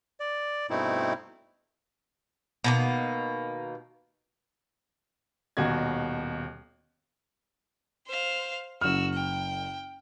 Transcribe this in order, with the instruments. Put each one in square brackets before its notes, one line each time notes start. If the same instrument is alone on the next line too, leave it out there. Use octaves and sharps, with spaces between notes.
[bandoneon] D5
G2 B2 A3 C4 D#4 E4
[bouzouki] B2 D#3 A#3
[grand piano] D#1 D#2 B2 F#4 G#6
[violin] C5 F5
[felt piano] F#1 F6 [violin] F#4 E6
[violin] G5